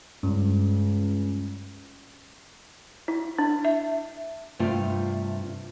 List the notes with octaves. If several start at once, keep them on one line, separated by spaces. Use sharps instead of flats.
C#2 G2
E4
D4
E5
G2 C3 A3 F4 F5